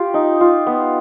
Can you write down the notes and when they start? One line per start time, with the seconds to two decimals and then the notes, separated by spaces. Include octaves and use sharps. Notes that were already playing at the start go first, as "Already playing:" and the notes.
Already playing: F4 G4
0.14 D#4
0.41 F4
0.67 B3